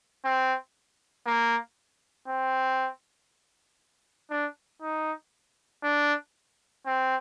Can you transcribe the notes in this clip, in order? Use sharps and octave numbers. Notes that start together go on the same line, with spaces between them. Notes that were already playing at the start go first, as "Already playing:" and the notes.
C4
A#3
C4
D4
D#4
D4
C4